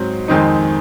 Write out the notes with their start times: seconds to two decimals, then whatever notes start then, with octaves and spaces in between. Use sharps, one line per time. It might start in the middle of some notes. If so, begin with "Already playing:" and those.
Already playing: G#2 F#3 C4
0.28 F2 D#3 G#3 C4 D#4